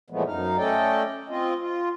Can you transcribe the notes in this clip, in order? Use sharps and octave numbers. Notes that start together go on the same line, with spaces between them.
A#2 E3 F3 G#3 A3 B3
F#2 D#4 F5
A3 C#4 A4 D5 D#5 G5
C4 F4 D#5
F4